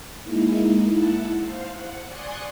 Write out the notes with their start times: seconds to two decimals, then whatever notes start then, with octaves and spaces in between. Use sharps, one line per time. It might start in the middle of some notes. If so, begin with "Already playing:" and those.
0.24 G#3 A#3 D#4 E4
0.90 E4 F#5 A5
1.41 C5 F5
1.69 F#5
2.07 D5 G#5 C6 C#6 D#6 F#6